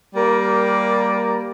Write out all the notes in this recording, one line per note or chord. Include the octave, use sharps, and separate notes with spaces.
G3 A#3 A#4